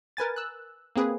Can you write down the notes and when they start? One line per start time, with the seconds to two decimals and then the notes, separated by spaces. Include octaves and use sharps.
0.17 A#4 B4 G#5 A6
0.36 E6 F#6
0.96 A#3 C4 G#4 B4